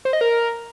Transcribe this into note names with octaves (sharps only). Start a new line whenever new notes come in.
C5
D#5
A#4